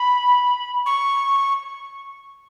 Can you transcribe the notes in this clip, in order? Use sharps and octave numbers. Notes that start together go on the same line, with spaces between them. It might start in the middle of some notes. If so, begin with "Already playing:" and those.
Already playing: B5
C#6